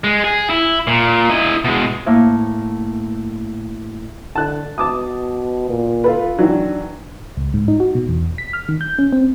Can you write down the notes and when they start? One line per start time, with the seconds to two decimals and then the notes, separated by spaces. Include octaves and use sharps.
0.04 G#3
0.24 G#4
0.50 E4
0.87 A#2
1.29 E4 D#5
1.65 B2 G#3
2.06 A2 A#3
4.35 D3 A5 F#6
4.78 B2 A5 D6 D#6
5.69 A#2
6.04 F4 A4 B4
6.39 D#3 E3 F#3 D4
7.37 C#2
7.54 G#2
7.68 D#4
7.80 F#4
7.95 B2
8.09 E2
8.38 B6
8.53 F6
8.69 D#3
8.81 G6
8.98 C#4
9.13 C4